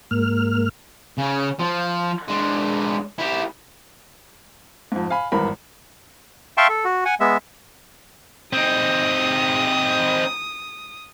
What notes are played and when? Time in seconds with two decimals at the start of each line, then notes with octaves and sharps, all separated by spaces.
0.11 G#2 A#3 F6
1.18 C#3
1.59 F3
2.28 G#3 D4
3.19 E4 G4
4.92 F2 G#2
5.10 F5 G#5 B5
5.32 G#1 E2 G2 A#4 B5
6.57 E5 F5 G5 A5 C6 C#6
6.69 A4
6.85 F#4
7.05 F#5 G#5
7.20 G#3 B3 E5
8.53 C4 D#4 D#6